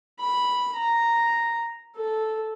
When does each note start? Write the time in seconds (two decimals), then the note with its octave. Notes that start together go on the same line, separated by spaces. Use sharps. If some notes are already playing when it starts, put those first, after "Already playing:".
0.19 B5
0.76 A#5
1.96 A4